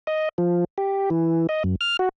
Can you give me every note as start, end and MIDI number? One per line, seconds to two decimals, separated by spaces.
0.07 0.29 75
0.38 0.64 53
0.78 1.10 67
1.10 1.47 52
1.49 1.63 75
1.64 1.75 42
1.81 1.97 89
1.99 2.09 66